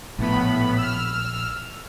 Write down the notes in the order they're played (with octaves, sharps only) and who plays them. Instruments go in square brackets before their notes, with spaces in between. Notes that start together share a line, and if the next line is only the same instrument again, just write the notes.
[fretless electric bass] A#1 [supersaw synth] A2 B3 B5
[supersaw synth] E6 F6